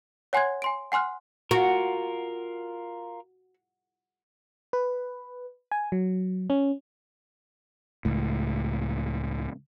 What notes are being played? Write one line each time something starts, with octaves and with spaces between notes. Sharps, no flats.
C#5 F#5 G#5 C6 F#6 G#6
G#5 C6 D7
F#5 G#5 C6 F6 F#6
F4 F#4 A#4
B4
G#5
F#3
C#4
C#2 A2